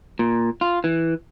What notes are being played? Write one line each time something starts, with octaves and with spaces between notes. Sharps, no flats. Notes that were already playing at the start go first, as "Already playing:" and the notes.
A#2
F4
E3